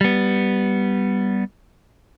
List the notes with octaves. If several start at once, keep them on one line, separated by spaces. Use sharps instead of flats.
G3 B3